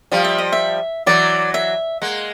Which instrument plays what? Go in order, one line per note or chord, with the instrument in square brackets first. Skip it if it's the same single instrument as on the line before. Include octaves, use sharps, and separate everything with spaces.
[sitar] F3 G3 [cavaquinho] F5
[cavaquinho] E5
D#5
E5
[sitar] E3 F#3 [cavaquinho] D5
[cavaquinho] E5
[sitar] G#3 A#3 [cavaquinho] F#5